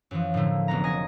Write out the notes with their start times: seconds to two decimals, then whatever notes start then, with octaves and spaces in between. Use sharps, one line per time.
0.11 F#2 E3 F3
0.34 A2 D3 F3 A3 A#3
0.68 F1 F#3 B3 A#5
0.84 D#5 G#5 A#6